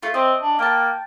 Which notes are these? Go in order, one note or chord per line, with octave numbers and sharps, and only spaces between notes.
A3 F4
C4 D#5
D4
A#3 G5 A5